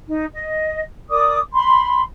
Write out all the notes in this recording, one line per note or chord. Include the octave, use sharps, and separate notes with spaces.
D#4
D#5
A#4 D5 D6 D#6
B5 C6